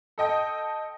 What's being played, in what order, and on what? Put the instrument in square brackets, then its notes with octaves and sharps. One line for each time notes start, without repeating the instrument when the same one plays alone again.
[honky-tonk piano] A4 D#5 G5 D#6